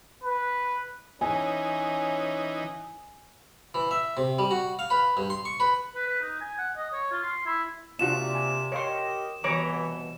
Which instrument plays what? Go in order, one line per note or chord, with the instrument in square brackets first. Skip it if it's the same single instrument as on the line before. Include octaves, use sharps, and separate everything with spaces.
[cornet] B4
[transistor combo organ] E3 D#4 [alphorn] C#4 [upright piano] G#5
[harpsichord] E3
E5
C3
G3
F#4
F5
B4
G2
C6
C#6
B4
[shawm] B4
B4
D#4
G#5
F#5
D#5
C#5
F4
C6
E4
[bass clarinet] C3 [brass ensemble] A#3 C4 D5 [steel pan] D4 F4 F#4 [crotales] E7
[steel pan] G#5
[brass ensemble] G4 A#4 D#5 [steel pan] C#5 F5 C6
[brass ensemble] C2 B2 [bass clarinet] E3 [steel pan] C#5 A#5 D6